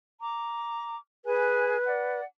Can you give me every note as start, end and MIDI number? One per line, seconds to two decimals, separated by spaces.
0.20 0.96 82
0.20 0.96 86
1.25 1.77 68
1.25 2.20 71
1.25 1.77 80
1.25 1.77 90
1.86 2.23 74
1.86 2.23 78